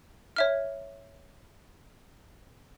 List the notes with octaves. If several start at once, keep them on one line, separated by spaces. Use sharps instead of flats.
C#5 E5 F6